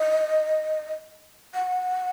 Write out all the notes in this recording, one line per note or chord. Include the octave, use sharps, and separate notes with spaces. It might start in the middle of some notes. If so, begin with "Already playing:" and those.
Already playing: D#5
F#5